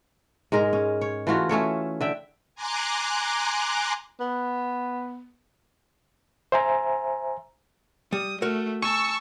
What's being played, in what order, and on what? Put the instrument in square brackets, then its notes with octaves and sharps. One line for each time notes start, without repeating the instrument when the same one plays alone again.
[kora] G#2 G#3 A#4
C#4
C#5
E3 A3 F4 F#4
A3 C#4 A4 C#5
D3 E5 G5
[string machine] G#5 A#5 C6 D6 F#6
[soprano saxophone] B3
[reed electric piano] C5 E5 G#5 A#5
[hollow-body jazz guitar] G3 [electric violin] D#6
[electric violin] A3 [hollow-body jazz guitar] F#4 A#4
[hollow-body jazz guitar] G#5 [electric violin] A5 E6 [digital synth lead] C#6